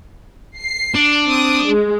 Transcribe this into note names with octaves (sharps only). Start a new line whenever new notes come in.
C7
D4
C4 D#6
G#3